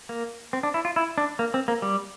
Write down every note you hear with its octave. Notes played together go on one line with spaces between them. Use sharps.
A#3
C4
D4
E4
F4
E4
D4
A#3
C4
A#3
G3